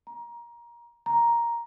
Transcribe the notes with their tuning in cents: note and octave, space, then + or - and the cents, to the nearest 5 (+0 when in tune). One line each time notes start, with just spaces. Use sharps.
A#5 +20
A#5 +5